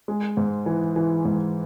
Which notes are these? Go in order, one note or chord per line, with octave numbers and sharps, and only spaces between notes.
G#3
G#2
E3
E3
G#2